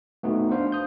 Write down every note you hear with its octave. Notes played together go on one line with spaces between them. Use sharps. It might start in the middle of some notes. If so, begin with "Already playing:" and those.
A3 B3 D#4 F#4
D4 C5 F5
D#6 G6